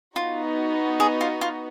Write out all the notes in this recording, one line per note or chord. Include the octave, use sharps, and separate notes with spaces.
B3 D#4 F4 F#4
G#4
F4
F4